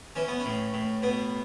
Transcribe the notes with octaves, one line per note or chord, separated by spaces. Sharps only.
E3 C#4
B3
C#4
A2
A2
B2 B3